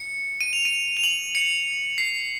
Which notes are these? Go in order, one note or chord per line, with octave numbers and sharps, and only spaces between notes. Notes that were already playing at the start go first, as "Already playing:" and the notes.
Already playing: C#7
D#7
F7
D#7
F7
F#7
C#7
C7